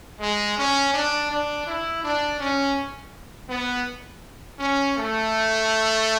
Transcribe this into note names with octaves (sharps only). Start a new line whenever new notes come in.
G#3
C#4
D4
D4
E4
D4
C#4
B3
C#4
A3